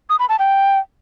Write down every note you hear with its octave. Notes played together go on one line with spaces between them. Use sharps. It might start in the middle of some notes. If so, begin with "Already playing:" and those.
D#6
B5
A5
G5